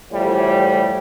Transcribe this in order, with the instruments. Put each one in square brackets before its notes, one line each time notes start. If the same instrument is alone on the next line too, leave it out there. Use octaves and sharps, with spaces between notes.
[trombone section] E2 A2 F3 G3